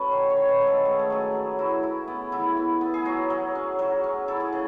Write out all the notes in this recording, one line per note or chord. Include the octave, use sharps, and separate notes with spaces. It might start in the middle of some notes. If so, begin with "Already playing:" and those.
Already playing: C#4 F#4 A4 B4
D#3 C#5
C#5
D#3
B4
G#3
A4
A3 G#4
A4
F#3 G#4
F#3
E4 F#4
E4
B3
E3 E4
B3
B3
G#4
F#3 F#4
F#3
C#4
F#3 F#4
C#4
E4 A4
G#4
C#3